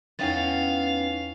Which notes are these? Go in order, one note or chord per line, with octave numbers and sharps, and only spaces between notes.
E2 B3 C#4 D#4 F5 G5 A6